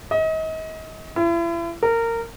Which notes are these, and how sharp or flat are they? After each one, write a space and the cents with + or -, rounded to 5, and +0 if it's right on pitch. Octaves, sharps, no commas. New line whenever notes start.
D#5 +35
E4 +40
A#4 -20